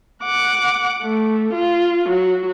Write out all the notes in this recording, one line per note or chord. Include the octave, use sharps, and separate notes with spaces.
F#5 D6
A3
F4
F#3 F#4